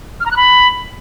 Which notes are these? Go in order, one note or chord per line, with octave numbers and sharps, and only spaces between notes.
F6
A#5
F#6
B5